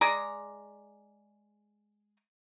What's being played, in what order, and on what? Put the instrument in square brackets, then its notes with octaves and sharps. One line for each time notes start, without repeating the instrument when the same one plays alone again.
[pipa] G#3 G#4 D5 A#5